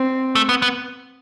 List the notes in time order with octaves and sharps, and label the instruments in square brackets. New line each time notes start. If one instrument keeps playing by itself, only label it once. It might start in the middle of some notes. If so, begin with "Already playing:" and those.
Already playing: [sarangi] C4
[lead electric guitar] A3
B3
B3